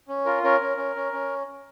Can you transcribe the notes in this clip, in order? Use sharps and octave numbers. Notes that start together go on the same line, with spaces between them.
C#4
F4 A#4
C#4 A#4
C#4
C#4
C#4
C#4